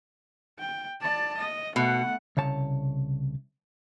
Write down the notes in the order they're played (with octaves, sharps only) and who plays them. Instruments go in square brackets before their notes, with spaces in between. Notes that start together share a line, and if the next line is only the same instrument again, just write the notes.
[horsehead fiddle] G5
D5 A5
D#5
[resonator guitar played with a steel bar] B2 [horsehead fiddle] A3 F#5
[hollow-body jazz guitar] C2 C#3 C#5 A5